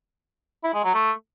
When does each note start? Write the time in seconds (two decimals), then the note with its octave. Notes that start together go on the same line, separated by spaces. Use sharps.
0.64 E4
0.74 G#3
0.84 F#3
0.94 A3